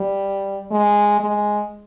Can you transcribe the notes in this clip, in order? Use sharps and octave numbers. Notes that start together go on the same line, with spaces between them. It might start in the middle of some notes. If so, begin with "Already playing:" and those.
Already playing: G3
G#3
G#3